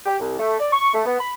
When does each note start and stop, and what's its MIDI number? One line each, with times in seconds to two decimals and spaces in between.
0.06 0.16 67
0.20 0.35 36
0.39 0.56 57
0.60 0.68 74
0.72 0.94 85
0.94 1.02 57
1.06 1.17 59
1.20 1.33 83